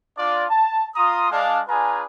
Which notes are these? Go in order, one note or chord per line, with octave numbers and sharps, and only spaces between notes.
D4 F4 D5
A5
F4 A#5 C6 D#6
G#3 D4 F5
D4 F4 G#4 B4 G#5 A#5